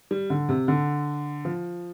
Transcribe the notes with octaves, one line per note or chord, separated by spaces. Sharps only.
G3
D3
C3
D3
F3